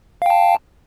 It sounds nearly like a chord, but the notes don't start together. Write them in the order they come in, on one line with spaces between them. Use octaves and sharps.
F5 G5 A5